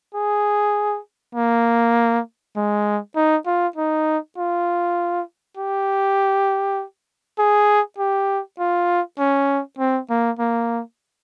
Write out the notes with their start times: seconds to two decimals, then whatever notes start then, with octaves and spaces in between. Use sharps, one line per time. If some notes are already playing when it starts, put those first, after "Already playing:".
0.15 G#4
1.35 A#3
2.56 G#3
3.15 D#4
3.46 F4
3.76 D#4
4.37 F4
5.57 G4
7.39 G#4
7.98 G4
8.59 F4
9.18 C#4
9.79 C4
10.10 A#3
10.39 A#3